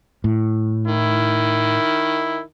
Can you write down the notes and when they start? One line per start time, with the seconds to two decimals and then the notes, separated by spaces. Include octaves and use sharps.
0.24 A2
0.88 D#3 E4